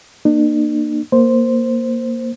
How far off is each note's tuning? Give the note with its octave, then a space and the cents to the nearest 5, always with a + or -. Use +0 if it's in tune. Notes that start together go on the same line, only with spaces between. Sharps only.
A#3 +0 D4 +45
A#3 +0 C5 +0